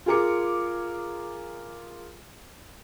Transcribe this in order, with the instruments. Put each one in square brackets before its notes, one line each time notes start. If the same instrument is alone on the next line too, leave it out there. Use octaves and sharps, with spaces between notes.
[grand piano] F4 G#4 A#4 D6 C#7